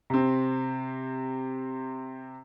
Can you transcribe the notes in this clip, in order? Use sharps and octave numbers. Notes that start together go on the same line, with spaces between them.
C3 C4